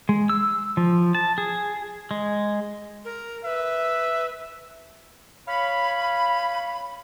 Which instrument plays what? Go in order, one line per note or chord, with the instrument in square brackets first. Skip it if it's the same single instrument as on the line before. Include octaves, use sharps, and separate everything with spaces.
[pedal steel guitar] G#3
E6
F3
A5
G#4
G#3
[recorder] A#4
[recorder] B4 [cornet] E5
[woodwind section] C#5 F5 B5